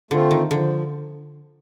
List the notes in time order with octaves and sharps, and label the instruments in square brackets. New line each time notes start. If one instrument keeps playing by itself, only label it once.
[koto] D3 [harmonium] A3 C4 F4
[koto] D#3
[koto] D3 [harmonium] F3